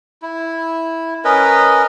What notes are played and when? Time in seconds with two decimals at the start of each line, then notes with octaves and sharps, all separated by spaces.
0.22 E4
1.25 C#4 A#4 B4 D#5